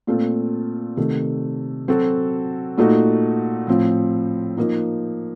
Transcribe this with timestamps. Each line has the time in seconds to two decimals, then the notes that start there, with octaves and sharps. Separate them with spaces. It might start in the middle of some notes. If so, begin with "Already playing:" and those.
0.07 A#2 A3 C4 F4
0.97 C3 D#3 A3
1.88 F#3 C4 F#4 A4
2.78 A#2 A3 D#4 F#4
3.67 A2 F3 C4
4.57 F3 A#3 D#4